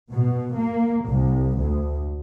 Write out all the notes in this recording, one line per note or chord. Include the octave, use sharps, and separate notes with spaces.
B2
A#3
C2
D2